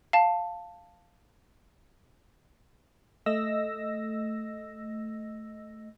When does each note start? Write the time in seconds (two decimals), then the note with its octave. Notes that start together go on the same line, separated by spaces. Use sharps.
0.13 F5 A5
3.26 A3 D#5 E6 A#6